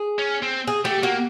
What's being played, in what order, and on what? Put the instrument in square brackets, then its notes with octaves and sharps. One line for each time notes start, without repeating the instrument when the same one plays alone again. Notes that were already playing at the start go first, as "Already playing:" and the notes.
Already playing: [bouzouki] G#4
[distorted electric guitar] C#4
C4
[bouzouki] G#4
[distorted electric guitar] A3 [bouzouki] G4
[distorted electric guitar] A#3 [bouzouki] F#4